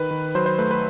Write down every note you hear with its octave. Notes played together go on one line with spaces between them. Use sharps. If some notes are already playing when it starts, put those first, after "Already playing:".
Already playing: D#3 B4
D#3
F#3 C5
C5
A3 B4
B4